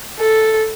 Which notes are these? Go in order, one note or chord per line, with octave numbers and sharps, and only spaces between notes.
A4